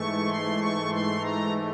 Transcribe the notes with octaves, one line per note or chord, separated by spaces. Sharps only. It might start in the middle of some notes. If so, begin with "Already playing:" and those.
Already playing: G#2 E3 A3 C#6
C6
C#6
C6
A#5